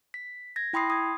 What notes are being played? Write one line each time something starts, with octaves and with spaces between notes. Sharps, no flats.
B6
G#6 A#6
E4 G5 B5 C6 D#6 C7
D#6 G#6